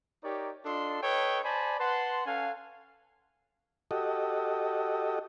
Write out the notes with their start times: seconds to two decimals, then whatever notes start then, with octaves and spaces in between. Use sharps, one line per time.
0.24 D#4 G4 A#4 C#5 D5
0.65 D4 F4 A4 D#5 C6
1.03 A4 B4 C#5 D#5 G5
1.44 C5 D5 G#5 A5 B5
1.80 B4 F#5 A5 C6
2.26 C#4 A4 F5 F#5 G#5
3.91 F#4 G4 A4 D#5